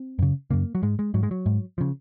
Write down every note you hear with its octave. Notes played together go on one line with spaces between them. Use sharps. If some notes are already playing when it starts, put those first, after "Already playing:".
Already playing: C4
F#2 C#3
F#2 C#3 A#3
F#3
G#2 G#3
G#3
G#2 F#3
G#3
F#3
G#2
C#3 F3